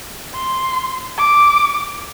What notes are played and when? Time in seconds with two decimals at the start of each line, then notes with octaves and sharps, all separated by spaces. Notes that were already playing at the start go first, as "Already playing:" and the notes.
0.34 C6
1.18 D6